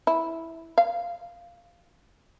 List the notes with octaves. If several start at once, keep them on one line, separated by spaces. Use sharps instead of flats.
E4
F5